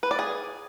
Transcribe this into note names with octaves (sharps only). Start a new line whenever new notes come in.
B4
D5
G#4